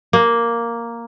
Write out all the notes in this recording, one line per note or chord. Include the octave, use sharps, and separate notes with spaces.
A#3